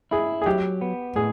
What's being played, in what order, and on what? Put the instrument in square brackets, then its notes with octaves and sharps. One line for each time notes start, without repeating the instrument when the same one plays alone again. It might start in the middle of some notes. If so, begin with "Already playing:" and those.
[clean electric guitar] E4 [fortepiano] G#4
[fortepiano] G#4
[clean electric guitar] F#3 [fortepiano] G4
[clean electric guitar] B3
[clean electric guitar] A2 [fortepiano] G#4